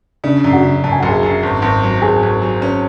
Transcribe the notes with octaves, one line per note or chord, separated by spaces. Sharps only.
C#3 D4 D5
F#2
F#4 F#5
C#3
F#2 A5
G#5
F#1 F#5
G#4 G#5
F#2
G#1
G#1
F#3
G#1 G#4 G#5
G#1
F#3
C#4